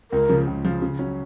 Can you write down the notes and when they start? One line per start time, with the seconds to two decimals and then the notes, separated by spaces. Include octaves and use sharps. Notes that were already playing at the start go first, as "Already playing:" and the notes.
0.11 C#2 A#4
0.29 C#3 F3
0.47 C#2
0.65 C#3 F3
0.82 C#3
0.99 F#3 C#4